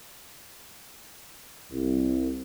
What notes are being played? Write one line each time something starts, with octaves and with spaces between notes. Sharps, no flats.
C2